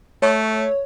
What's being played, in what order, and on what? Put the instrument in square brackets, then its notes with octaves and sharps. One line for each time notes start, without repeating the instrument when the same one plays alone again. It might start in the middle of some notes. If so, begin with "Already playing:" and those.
[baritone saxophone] A3 [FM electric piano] C#5